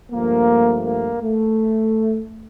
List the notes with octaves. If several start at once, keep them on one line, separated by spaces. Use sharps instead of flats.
G2 F3 A3 A#3
A#3
A3